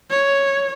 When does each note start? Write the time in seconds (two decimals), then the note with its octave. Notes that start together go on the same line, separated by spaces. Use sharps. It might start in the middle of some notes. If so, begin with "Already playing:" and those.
0.10 C#5